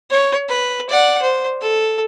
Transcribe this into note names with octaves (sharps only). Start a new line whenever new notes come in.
C#5
B4
D5 F#5
C5
A4